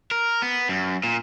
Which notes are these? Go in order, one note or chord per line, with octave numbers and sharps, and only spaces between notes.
A#4
B3
F#2
A#2